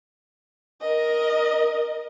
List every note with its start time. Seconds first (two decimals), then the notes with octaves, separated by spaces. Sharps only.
0.81 A#4 D#5